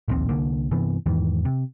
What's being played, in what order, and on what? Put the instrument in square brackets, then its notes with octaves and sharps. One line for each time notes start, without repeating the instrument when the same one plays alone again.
[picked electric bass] D1 A#1 D#2 C4
C2 D3 A#3
G2 C3 E3 B3
E2 G#2 D#3 E3
C3